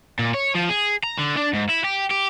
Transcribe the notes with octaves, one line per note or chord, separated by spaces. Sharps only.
A#2
C#5
F3
G#4
A#5
D3
D4
G#2
E4
G4
G4